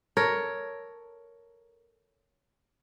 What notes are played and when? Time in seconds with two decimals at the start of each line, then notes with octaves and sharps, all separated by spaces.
0.17 A4 A#4 C#5